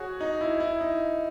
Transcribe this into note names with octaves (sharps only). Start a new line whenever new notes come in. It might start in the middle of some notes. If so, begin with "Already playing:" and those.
Already playing: F#4 G#4 C#5
D#4
E4
E4
D#4